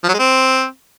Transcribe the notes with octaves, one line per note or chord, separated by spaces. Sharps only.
F3
F#3
G#3
C4